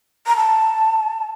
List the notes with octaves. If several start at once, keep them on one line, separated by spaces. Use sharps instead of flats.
A#5
A5